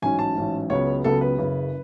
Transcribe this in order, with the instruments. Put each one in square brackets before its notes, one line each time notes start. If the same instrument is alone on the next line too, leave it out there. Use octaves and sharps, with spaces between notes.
[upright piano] A1 G#2 F#3 C#4 G#5
A5
A1 G#2 F#3 C#4
C#2 C#3 F#3 B3 C#5
C#2 C#3 F#3 B3 A4
B4
F#1 F#2 C#3